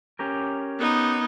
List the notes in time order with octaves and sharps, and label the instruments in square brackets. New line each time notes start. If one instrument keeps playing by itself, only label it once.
[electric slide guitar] C#4 G4 A#4
[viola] B3 D#4